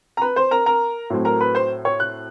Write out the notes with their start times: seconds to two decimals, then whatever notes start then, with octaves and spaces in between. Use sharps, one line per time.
0.17 A#5
0.21 B4 B5
0.36 C5 C6
0.51 A#4 A#5
0.66 A#4 A#5
1.10 A2 F#3 A3 C4
1.25 A#4 A#5
1.41 B4 B5
1.55 C5 C6
1.85 C#5 C#6
2.00 F#6